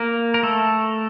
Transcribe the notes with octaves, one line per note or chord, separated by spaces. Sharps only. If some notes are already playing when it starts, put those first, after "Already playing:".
Already playing: A#3 A#4
A#4
A3 A4